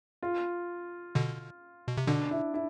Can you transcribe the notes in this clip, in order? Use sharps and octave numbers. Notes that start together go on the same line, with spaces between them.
F4
B2 D3
B2
C3
B2 D3 D4
E4
E4